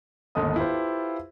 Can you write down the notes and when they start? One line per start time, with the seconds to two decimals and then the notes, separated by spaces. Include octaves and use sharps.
0.35 G1 D#2 G#2 A4 D#5 D#6
0.56 E4 F4 G4 A4 B4 C5